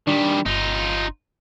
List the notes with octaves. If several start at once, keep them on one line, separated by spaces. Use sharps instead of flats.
D#3 G3 D4
G1 D#4 F4